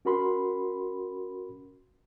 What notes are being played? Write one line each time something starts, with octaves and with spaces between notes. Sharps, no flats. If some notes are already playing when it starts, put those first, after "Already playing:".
C#4 F#4 A#4 B5 C6